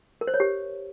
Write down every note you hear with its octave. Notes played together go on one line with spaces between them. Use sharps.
A#4
C5
C#5
G4